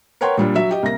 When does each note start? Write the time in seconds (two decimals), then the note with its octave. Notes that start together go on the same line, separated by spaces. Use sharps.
0.21 A#4 B4 C#5 F#5 G5 C6
0.37 A#2 G3 D4
0.55 F#3 E5
0.71 G4 D#5
0.83 C2 A#3 A#6